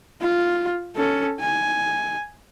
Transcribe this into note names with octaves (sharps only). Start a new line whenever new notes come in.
F4
C#4 A4
G#5